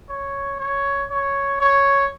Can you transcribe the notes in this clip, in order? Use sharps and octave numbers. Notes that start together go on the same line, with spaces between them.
C#5
C#5
C#5
C#5